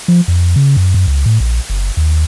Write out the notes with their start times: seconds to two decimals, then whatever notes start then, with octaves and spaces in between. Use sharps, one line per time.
0.08 F3
0.28 F2
0.56 C#3
0.76 F#2
0.94 F#2
1.07 C#2
1.26 A2
1.40 A#1
1.70 F#1
1.97 D#2